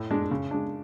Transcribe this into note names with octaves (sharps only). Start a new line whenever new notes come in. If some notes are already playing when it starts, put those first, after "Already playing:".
Already playing: A2
G#3 D4
C#3
G#3 D4